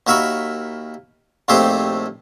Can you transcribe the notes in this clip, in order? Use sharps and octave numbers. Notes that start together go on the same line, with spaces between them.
D#2 F#4 A#4 E5 B5 C#6
A#1 D#2 A3 C4 G4 C5